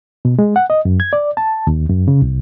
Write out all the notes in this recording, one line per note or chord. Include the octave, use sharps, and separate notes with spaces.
B2
G#3
F#5
D#5
F#2
G#6
D5
A5
D#2
F#2
C#3
C2